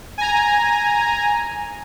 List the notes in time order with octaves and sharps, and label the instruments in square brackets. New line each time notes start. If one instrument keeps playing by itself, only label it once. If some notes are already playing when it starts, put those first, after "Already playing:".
[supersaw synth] G#5 A#5